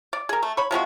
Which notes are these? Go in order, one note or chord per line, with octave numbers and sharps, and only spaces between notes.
D5
G#4 A#4
A3
C#5 B5
C3 F3 G#3 F#4